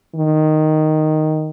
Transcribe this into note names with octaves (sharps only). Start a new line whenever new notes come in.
D#3